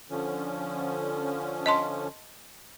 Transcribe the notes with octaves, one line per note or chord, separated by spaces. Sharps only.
D3 F3 C#4
D#5 A5 C6